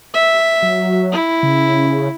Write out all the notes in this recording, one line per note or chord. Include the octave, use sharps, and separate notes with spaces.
E5
F#3
E4
C#3